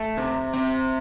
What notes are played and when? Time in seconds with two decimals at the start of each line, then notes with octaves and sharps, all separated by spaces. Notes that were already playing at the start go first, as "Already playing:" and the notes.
Already playing: A3
0.17 C3
0.53 C4